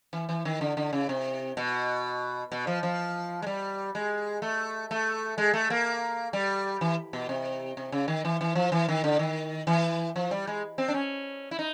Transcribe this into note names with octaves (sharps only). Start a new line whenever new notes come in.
E3
E3
D#3
D3
D3
C#3
C3
B2
B2
F3
F3
G#3
G3
G#3
A3
A3
G#3
A3
A#3
G3
E3
B2
C3
C3
C#3
D#3
E3
E3
F3
E3
D#3
D3
D#3
E3
F3
G3
G#3
C4
D4
C#4
E4
D#4